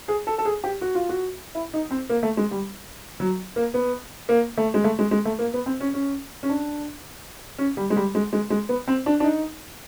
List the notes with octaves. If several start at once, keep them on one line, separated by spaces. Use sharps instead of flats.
G#4
A4
A4
G#4
G4
F#4
F4
F#4
E4
D#4
C4
A#3
A3
G#3
G3
F#3
A#3
B3
A#3
A3
G#3
A3
G#3
G#3
A3
A#3
B3
C4
C#4
C#4
C#4
D4
C#4
G3
G#3
G3
G#3
G#3
G#3
B3
C4
D4
D4
D#4